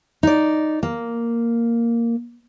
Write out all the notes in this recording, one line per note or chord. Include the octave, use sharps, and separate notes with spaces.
D#4 D5
A#3